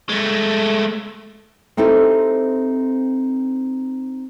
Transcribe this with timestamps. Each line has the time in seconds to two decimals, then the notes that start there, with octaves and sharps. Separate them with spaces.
0.09 G#3 A3
1.77 C4 D#4 E4 G4 A4 C5